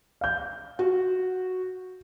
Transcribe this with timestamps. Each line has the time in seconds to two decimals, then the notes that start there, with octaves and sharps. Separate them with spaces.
0.21 F5 G6
0.79 F#4